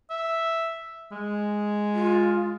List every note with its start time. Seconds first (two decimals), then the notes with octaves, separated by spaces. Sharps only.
0.10 E5
1.12 G#3
1.94 F4